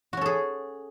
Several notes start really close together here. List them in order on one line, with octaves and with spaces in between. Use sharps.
F#4 C#4 A4 G#4